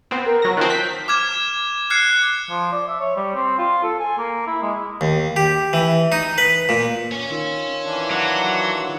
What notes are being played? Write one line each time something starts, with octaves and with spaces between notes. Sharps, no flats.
B3 C4
A#4
F#3 A#6
D#3 F3 C4 F#6
G6 B6
D6 F6 G#6 E7
F6 F#6 G#6 C7 C#7
F3
D5
E5
C#5
G3
C4
F4
A4
G#5
A#3
E4
G#3
D#2
G4
E3
D#4
B4
A#2
C#5 G#5
D#3 F4 E6
E3 D4
F#3 F#5
G3 C#6